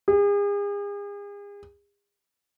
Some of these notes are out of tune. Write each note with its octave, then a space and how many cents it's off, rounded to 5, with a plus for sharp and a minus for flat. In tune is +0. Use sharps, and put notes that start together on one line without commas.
G#4 -40